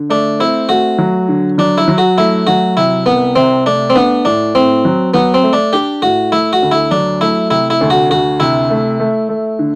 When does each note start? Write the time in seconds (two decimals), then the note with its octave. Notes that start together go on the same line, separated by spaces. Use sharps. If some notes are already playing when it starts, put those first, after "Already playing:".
Already playing: D3
0.10 A3 D4
0.40 C4 E4
0.69 A3 F#4
0.98 F#3
1.29 D3
1.58 F#3 D4
1.78 E4
1.88 F#3
1.98 F#4
2.18 A3 E4
2.47 F#3 F#4
2.77 C3 E4
3.06 C2 B3
3.36 C3 C4
3.66 A3 D4
3.90 C4
3.96 B3 D4
4.25 A2 D4
4.54 A2 C4
4.85 F#3
5.14 F#3 B3
5.34 C4
5.43 A3
5.53 D4
5.73 D4 G4
6.02 A2 F#4
6.32 A3 E4
6.53 F#4
6.62 D2
6.71 E4
6.91 F#3 D4
7.21 A3 E4
7.51 C3 E4
7.70 E4
7.81 D2
7.90 F#4
8.10 D2 F#4
8.40 C3 E4
8.70 A3
9.00 A3
9.29 A3
9.59 D3